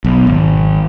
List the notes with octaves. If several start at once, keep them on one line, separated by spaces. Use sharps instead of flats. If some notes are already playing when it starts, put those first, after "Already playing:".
B1
G#1